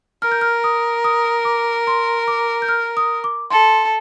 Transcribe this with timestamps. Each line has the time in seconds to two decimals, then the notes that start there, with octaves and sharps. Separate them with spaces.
0.22 A#4 F6
0.32 G6
0.41 F6
0.64 D#6
1.04 D#6
1.45 D6
1.87 C6
2.28 D6
2.62 G6
2.69 F6
2.97 D#6
3.24 D6
3.50 A4 C6